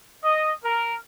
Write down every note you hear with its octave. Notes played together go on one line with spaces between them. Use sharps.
D#5
A#4